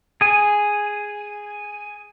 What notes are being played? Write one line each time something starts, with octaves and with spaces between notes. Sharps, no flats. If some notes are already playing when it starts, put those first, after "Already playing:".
G#4 G#5